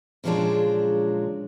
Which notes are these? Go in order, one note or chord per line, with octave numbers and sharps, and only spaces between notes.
A#2 C#3 F3 F#3 G#3 D4